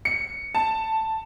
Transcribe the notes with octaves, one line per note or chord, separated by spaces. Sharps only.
C#7
A5